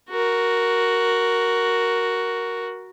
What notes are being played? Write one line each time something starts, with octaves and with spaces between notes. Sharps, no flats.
F#4 A#4